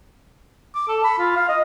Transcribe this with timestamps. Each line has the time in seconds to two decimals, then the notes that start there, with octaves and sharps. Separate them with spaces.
0.75 D6
0.88 A4
1.04 B5
1.19 F4
1.36 F5
1.49 D#5